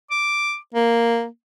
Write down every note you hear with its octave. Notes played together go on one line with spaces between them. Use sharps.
D6
A#3